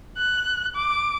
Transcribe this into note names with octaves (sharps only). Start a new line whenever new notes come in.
F#6
D6